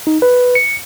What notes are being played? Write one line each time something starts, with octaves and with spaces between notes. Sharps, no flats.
D#4
B4
C#7